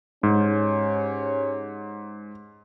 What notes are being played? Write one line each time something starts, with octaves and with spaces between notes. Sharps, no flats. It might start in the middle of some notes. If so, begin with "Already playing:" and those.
G#2 C#4 G4 C#5